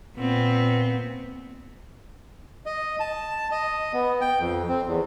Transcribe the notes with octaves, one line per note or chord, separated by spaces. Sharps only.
A#2 B3 C4
D#5
A5
D#5
B3
G5
F2
C4
E2